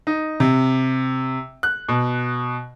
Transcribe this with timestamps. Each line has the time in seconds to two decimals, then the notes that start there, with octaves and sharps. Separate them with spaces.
0.07 D#4
0.40 C3
1.63 F#6
1.89 B2